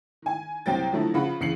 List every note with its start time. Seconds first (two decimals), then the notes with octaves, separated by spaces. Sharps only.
0.22 D#3 G#5
0.66 C2 F#3 C4 G5 A6
0.92 D3 F3 F#3 A3 D#4 E4
1.14 C#3 F3 F#5 B5
1.40 E2 C#3 C7 C#7 F#7